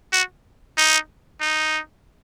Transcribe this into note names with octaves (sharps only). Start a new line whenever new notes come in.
F#4
D#4
D#4